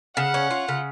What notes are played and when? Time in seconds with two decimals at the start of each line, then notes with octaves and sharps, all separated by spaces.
0.17 C#3 F#5
0.34 C#4
0.51 F4
0.68 C#3